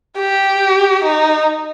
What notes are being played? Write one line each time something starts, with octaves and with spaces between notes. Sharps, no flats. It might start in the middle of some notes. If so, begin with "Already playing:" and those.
G4
D#4